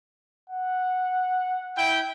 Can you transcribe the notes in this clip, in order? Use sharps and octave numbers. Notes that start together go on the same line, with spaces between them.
F#5
E4 G5